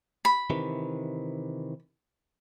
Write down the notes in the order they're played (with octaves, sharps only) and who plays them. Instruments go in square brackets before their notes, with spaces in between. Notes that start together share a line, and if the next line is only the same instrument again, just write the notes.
[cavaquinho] B5
[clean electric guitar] C3 D#3 E3